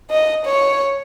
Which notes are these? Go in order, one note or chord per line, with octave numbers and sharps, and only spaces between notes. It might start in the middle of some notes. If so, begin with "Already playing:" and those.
D#5
C#5